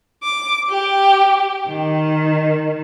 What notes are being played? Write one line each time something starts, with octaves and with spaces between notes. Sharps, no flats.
D6
G4
D#3